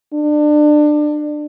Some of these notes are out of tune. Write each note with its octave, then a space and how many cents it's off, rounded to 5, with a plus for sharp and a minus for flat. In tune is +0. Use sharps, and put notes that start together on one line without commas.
D4 +25